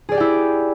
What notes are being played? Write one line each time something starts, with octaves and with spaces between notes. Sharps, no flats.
E4 G4 G#4 D5 G5